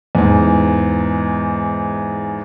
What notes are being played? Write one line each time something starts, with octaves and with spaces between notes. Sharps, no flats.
E2 G#2